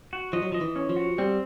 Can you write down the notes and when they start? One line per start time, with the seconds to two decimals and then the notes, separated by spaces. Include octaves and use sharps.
0.13 F#4
0.33 F3 D#5
0.42 F#3
0.52 F3 D#5
0.61 E3
0.76 C#4
0.90 F3
0.96 F#4
1.18 G3 C4